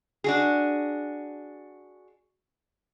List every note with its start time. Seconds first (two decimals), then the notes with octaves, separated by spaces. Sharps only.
0.24 D4 F#4 G#4